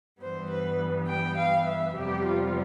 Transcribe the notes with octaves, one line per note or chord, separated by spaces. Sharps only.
G2 E3 G3 B3 C5
B4
G5
F5
E5
F2 C3 G3 B3 G4
F4